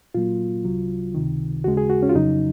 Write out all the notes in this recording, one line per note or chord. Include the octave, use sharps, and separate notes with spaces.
A#2 F#3 A#3 F4
C2 C3 F#3
C#2 C3 D#3
D#2 C#3 G#3 F#4
G#4
F#4
C#4
F4
F2 C#3 F#3 D#4